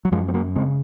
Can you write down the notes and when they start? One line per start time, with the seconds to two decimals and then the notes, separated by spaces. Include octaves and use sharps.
0.05 F#3
0.12 F#2 F3 G#3
0.28 C4
0.34 F#3 A#3
0.55 C#3 G#3 C4